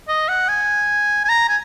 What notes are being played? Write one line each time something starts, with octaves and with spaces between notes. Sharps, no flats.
D#5
F#5
G#5
G#5
A#5
G#5